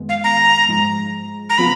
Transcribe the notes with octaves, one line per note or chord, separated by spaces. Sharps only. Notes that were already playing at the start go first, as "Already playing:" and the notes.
Already playing: F#2 D#3 G#3 B3
F5
A#5
G#2 F3 G#3
A#5
C#3 F3 B3 F4 B5